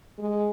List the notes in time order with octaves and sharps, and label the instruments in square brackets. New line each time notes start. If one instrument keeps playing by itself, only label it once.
[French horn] G#3